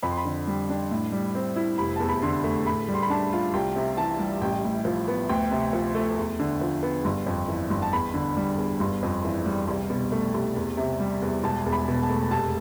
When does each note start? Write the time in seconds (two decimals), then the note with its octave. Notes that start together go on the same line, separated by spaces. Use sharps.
0.03 F2 B5
0.11 C6
0.17 B5
0.25 D3
0.47 G3
0.69 D4
0.91 A2
1.12 G3
1.35 C4
1.56 E4
1.78 F1 B5
1.96 E2 A5
2.09 B5
2.22 D3 C6
2.44 A3
2.66 A2 B5
2.89 G3
2.94 C6
3.02 B5
3.10 D4 A5
3.33 F4
3.54 C2 G5
3.76 C3
3.97 E3 A5
4.19 G3
4.41 A1 G5
4.64 A2
4.85 F3
5.08 B3
5.29 D2 G5
5.51 C3
5.73 F3
5.95 A3
6.18 E2
6.40 D3
6.61 F3
6.83 B3
7.05 G1
7.27 F2
7.48 E3
7.70 G1
7.82 A5
7.93 E2 B5
8.14 D3
8.37 G3
8.58 E2
8.80 G1
9.03 F2
9.25 E3
9.46 G3
9.68 C2
9.90 B2
10.12 A3
10.34 C2
10.56 E2
10.77 C3
11.00 G3
11.22 E2
11.44 E1 A5
11.66 E2
11.72 B5
11.88 B2
12.03 A5
12.09 A3
12.31 F1 A5